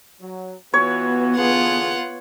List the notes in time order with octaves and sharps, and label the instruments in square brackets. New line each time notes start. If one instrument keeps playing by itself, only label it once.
[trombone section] F#3
[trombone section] E3 F4 F#4 [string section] B3 [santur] C#5
[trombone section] D3 E3 G#4 [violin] F4 F#5